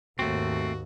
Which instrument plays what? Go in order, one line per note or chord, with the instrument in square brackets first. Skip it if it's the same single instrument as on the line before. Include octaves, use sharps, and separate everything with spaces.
[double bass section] D#2 G#2 [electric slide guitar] A3 C4 [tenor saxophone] F#4